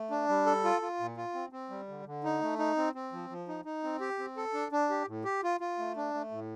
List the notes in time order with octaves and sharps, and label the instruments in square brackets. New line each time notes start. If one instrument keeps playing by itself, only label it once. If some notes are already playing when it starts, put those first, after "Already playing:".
Already playing: [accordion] A3
D4
G3
A4
F4
F4
A#2
F4
C4
C4
G3
D3
D3
D#4
A3
D#4
C4
C4
F3
F3
D#4
D#4
C4
G4
C4
A4
D4
D4
G4
A2
G4
F4
F4
A3
D4
A3
A2